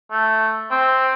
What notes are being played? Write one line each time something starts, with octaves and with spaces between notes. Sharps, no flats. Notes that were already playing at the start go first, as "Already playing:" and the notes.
A3
C4